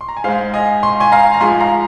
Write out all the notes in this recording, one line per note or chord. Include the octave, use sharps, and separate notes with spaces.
C6
A#5
G#5
G#2 G#3 C5 F5
D#5 G#5
C6
G#5 C6
F5 A#5
A#5
G#2 F3 G#3 G#5 C6
F5 A#5